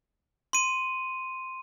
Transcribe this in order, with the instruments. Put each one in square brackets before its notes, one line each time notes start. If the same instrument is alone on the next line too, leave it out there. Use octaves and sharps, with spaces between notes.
[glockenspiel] C6 D#7